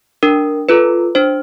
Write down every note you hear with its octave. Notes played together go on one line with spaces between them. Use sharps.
D4 A#4
F4 A4 B4
D4 C5